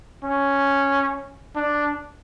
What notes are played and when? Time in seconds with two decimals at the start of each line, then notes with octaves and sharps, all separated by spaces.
0.23 C#4
1.55 D4